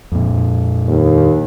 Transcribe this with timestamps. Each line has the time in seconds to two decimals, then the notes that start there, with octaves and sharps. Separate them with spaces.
0.12 F2 A#2
0.88 D#2